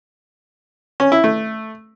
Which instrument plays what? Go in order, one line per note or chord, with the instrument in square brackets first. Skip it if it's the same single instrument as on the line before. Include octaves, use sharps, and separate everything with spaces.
[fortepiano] C#4
E4
A3